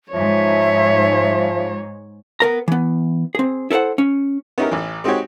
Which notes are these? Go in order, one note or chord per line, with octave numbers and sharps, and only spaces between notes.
G#2 F3 C#5 E5
B3 A#4 A#5
E3 B3
C4 G#4
E4 A4 A#4 C5 F#5
C#4
B3 C#4 D#4 E4 G4 A#4
A1 E3
G#3 C4 D#4 F#4 G4 C#5